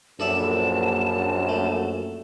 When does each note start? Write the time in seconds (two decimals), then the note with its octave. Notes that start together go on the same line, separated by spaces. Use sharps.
0.20 A#1 F#2 A4 D5 E5 A5
1.49 A3